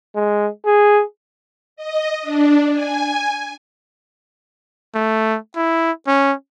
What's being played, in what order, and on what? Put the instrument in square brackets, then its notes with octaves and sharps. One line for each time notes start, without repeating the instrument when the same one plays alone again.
[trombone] G#3
G#4
[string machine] D#5
D4
G#5
[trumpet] A3
E4
C#4